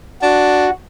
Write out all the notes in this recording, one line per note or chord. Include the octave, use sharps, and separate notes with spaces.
D4 F#4